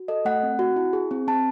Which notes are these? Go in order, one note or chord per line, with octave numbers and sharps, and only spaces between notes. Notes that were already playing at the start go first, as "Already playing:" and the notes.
Already playing: F#4
A4 D#5
A3 F#5
C4
F#4
E4
G#4
C4
C4 A5